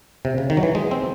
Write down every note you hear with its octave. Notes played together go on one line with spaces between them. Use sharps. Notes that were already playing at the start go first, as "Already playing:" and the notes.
C3
C#3
D#3
F#3
E3
G#3
C4